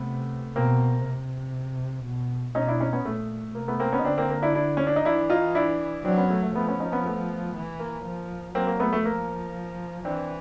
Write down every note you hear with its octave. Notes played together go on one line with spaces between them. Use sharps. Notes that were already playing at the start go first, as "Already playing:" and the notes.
Already playing: C3 A3 B3
B2 A#3 C4
C3
B2
B2 C#4 D#4
D4 E4
C#4 D#4
B3 C#4
A#2 A3
C3 A#3
A3 B3
A#3 C4
B3 C#4
D#4
D3 C4 D4
A#3 C4
A#3
D4 E4
D4 E4
C#4
D4
D#4
E3 D4 E4
D#4 F4
D4 E4
F#3 C4 D4
B3 C#4
A3
A3
F3 A3 B3
B3 C#4
C#4 D#4
B3 C#4
A3 B3
E3
A#3
F3
F#3 A#3 C4
A#3
A3 B3
A3
F3 A#3
E3 C4 D4